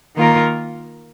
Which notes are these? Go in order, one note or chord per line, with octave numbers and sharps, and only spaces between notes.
D#3 A#3 F4 A#4